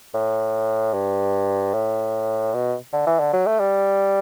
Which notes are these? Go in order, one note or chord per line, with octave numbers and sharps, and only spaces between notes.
A2
G2
A2
B2
D3
E3
D3
F#3
A3
G3